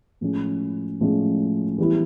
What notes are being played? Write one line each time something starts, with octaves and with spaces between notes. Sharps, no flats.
A2 F3 G#3 C#4
A2 F3 G#3 C#4
E3 G3 B3 E4